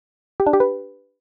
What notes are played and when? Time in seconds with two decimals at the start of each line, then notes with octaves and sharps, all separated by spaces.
0.40 G4
0.47 D4
0.53 G4
0.60 B4